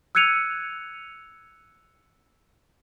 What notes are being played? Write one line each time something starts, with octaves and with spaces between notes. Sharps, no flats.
E6 F#6 G#6 C#7 D#7 F7